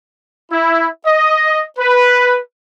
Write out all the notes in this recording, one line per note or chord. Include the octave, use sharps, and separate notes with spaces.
E4
D#5
B4